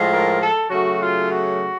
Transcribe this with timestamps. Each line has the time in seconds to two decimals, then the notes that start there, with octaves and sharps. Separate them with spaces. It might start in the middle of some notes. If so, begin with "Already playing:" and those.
Already playing: A2 F3 G#3
0.11 A#4
0.41 A4
0.70 C#3 F#3 A3 F#4
1.00 F4
1.30 F#4